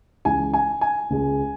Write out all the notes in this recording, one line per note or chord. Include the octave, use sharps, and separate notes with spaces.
C#2 C#3 E3 G#5
G#5
G#5
C#2 C#3 G#3